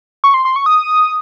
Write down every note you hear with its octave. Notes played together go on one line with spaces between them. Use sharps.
C#6
C6
C6
C#6
D#6